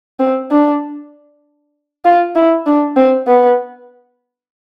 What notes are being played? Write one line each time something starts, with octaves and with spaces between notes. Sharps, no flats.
C4
D4
F4
E4
D4
C4
B3